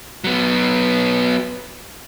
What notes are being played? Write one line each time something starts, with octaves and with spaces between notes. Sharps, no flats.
F#3 B3